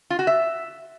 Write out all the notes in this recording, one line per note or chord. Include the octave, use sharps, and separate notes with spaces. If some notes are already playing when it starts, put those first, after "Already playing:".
F4
F#4
E5